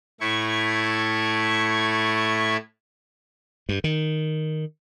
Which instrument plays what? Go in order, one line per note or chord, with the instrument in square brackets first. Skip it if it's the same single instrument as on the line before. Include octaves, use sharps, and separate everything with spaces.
[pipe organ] A2 A3 E4 C#6 G#6
[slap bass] G2
D#3